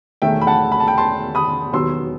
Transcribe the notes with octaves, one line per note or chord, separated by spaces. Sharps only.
E1 E2 D#3 A3 E5 G5
B5
F#5 A5
B5
A5
G5 B5
A5 C6
B5 D#6
E1 D#2 D#3 F#3 B3 C6 E6